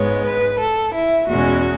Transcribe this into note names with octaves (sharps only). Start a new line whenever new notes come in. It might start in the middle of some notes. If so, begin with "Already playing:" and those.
Already playing: G#2 G#3 B3 C#5
B4
A4
E4
E2 B2 G#3 C#4 F#4